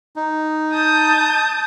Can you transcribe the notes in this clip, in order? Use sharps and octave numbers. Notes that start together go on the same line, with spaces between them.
D#4
A5 D#6 G6